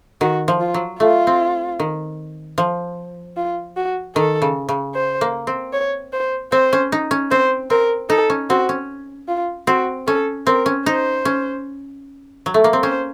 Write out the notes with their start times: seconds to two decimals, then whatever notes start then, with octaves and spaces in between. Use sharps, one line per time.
0.21 D#3 F#4
0.48 F3
0.60 F4
0.74 F#3
1.00 A3 F4
1.27 C4
1.79 D#3
2.58 F3
3.37 F4
3.77 F#4
4.16 D#3 A4
4.42 C#3
4.69 C#3
4.95 C5
5.21 A#3
5.47 C4
5.73 C#5
6.13 C5
6.52 C4 C5
6.73 C#4
6.92 D#4
7.11 C#4
7.31 C4 C5
7.70 C4 A#4
8.10 D#4 A4
8.30 C#4
8.50 C4 F#4
8.69 C#4
9.28 F4
9.67 C4 F#4
10.07 C#4 A4
10.46 C4 A#4
10.66 C#4
10.86 D#4 C5
11.25 C#4
12.46 F#3
12.54 A3
12.64 A#3
12.73 C4
12.83 C#4 C5